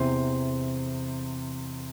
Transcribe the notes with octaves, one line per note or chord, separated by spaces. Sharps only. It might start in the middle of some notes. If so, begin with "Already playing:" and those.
Already playing: E2 C3 E3 C5